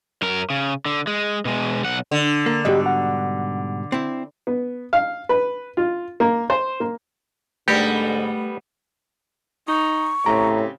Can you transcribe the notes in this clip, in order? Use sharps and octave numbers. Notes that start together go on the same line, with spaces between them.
F#2 A#4
C#3
D3
G#3
B2 G#3
B1 F#5
D3
A#3
G#2 B2 G3 G4 D#5
F#5
C4 E4
B3
F5
B4
F4
A#3
C5
A#3
G#2 D3 G3 A3 B3 G4 A4 A#4
D#4 C#6
A2 C#3 C4 G4 A#5